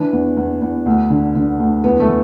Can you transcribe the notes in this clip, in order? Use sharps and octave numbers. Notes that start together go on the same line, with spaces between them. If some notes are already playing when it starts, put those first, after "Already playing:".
Already playing: E3 D4
E2
E2
E2
D2
D3
D3
D2
E2 B3
A3
E3